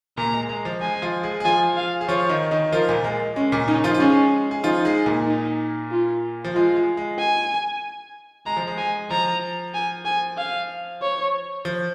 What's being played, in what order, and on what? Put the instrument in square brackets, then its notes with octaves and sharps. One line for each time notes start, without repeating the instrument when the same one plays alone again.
[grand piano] A#2 A#3 [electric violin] A#5
[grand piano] G#3
G#3
F3
[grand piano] G#3 [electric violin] G#5
[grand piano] F3 F4
G#3 G#4
G#4
[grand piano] F3 F4 [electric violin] G#5
[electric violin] F5
[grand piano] G#4
[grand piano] F3 F4 [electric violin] C#5
[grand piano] D#3 D#4
D#3 D#4
[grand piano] F3 F4 [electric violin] A#4
[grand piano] A#2 A#3
G#3
[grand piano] G#3 [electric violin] C#4
[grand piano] A#2 A#3
[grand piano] C#3 C#4 [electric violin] D#4
[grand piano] F3 F4
F4
[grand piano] G#3 G#4 [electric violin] C#4
[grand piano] G#4
[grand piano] F3 F4 [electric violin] D#4
[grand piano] G#3 G#4
A#2 A#3
[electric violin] D#4
F4
[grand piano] F3
[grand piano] G#3 [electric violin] F4
[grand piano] G#3
G#3
[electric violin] G#5
[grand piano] G#3 [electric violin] A#5
[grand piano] F3
G#3
[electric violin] G#5
[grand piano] F3 [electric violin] A#5
[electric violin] G#5
G#5
F5
C#5
[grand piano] F3